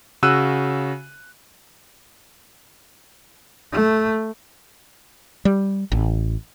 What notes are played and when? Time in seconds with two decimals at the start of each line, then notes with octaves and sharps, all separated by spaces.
0.23 C#3 F#4 E6 F#6 D#7
3.72 A3
5.45 G3
5.92 A1